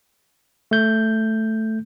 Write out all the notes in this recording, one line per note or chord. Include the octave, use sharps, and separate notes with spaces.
A3 G6